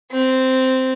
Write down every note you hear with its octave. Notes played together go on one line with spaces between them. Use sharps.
C4